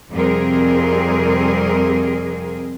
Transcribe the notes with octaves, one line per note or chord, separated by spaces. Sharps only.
F2 C3 G3 C4 G#4 A#4